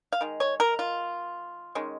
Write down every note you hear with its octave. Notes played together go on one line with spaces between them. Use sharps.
F5
D#3 G#3
C#5
A#4
F4
D#3 G#3 C#4